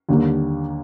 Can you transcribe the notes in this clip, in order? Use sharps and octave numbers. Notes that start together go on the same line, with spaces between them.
D#2 D3 G3 A#3